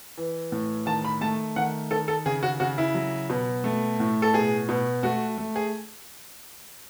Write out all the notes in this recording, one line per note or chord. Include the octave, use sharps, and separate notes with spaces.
E3
A2
D#3 A5
B5
A3 A5
D#3 F#5
D#3 A4
A4
C#3 G#4
F#4
C#3 F#4
E4
F#3
B2
A3
A2
A4
B2 G#4
B2
A3 F#4
A3
G#4